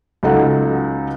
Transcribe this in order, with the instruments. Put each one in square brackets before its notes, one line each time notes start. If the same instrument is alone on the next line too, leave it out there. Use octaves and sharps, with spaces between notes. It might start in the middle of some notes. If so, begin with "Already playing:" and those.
[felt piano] C#2 F#3 D#4 A4 F#5